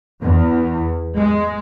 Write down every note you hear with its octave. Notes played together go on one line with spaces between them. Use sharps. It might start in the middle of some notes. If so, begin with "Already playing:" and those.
E2
G#3